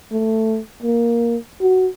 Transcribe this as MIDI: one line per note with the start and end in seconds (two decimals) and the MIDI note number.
0.12 0.59 57
0.83 1.37 58
1.62 1.88 66